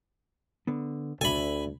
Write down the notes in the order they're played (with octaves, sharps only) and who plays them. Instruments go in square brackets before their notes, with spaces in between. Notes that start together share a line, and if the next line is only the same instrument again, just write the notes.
[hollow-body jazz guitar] D3 B3
[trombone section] D2 [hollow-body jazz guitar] A4 D5 E5 [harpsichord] G#5 B5